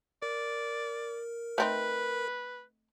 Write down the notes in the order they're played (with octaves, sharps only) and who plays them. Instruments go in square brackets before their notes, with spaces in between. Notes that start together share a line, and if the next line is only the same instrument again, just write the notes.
[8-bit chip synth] A#4 [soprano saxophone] D5
[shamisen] A3 C4 D#4 [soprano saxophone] B4